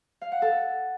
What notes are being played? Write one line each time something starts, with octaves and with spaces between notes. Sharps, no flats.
F5
F#5
A4